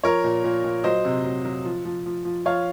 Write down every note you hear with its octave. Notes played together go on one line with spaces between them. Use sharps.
F3 A#4 C#5
A#2
A#2
A#2
F#3 C5 D#5
C3
F#3
F#3
F3
F3
F3
F3
F3 C#5 F5